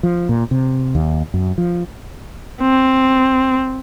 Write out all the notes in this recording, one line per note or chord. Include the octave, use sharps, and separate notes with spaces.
F3
A#2
C3
D#2
F#2
F3
C4